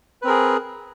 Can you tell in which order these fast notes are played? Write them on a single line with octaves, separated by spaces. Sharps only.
B4 C4 A#4 G#4